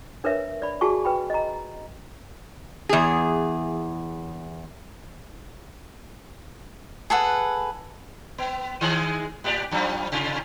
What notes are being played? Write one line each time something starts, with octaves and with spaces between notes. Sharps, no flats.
D4 A#4 B4 C#5 E5
D5 B5
F#4 G#4 G#5 A5 C#6
B4 G5 B5
D#5 A#5
E2 G#4
G#4 A4 B4 F#5
B3
D#3 G#3 G#4
A2 G4 D5
F#2 F3 G3
C3 F4